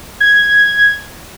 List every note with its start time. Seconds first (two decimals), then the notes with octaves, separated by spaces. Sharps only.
0.20 G#6